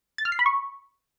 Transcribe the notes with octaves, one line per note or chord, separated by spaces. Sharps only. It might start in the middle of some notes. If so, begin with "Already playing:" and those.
A6
F6
C7
B5
C#6